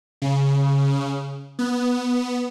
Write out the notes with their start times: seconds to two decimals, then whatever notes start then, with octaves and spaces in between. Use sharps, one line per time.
0.22 C#3
1.59 B3